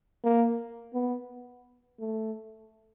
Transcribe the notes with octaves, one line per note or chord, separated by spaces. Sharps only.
A#3
B3
A3